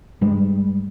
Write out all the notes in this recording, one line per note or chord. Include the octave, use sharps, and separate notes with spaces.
G2 G3 G#3